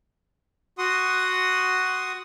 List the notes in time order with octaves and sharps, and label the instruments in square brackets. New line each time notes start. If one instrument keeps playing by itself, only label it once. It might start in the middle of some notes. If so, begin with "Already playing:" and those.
[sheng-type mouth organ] F#4 F#5 C6 D#6